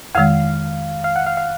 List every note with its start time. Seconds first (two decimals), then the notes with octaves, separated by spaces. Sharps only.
0.15 F2 D#3 G#3 F5
1.04 F5
1.16 F#5
1.26 F5
1.37 F5